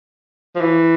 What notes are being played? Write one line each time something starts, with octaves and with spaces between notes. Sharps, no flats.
F3
E3